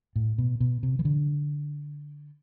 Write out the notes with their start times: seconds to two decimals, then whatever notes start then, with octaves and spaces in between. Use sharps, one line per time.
0.16 A2
0.38 B2
0.60 B2
0.83 C3
0.99 E3
1.05 D3